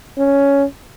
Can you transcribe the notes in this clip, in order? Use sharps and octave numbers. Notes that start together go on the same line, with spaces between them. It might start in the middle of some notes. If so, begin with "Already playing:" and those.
C#4